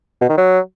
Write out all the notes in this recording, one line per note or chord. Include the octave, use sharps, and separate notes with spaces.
B2
D#3
F#3